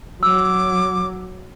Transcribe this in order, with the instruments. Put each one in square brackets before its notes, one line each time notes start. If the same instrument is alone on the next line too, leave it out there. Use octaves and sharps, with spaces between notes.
[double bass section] F#3 [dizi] D6 [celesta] E6